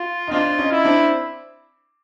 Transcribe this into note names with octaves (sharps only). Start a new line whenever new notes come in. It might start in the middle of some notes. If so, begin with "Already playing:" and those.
Already playing: F4
D#4
C4 D4 F4
C#4 D#4
E4
C4 D4